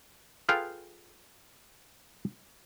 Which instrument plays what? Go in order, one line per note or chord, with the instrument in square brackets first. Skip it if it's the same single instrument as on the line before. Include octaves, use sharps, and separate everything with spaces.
[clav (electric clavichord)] F4 G#4 A4 B4 F5 G5